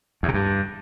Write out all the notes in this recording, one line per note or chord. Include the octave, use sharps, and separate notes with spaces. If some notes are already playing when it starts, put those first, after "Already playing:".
E2
C3
G2